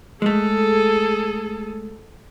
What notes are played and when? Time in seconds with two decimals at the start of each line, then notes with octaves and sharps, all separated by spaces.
0.22 G#3 A3 G#4 A4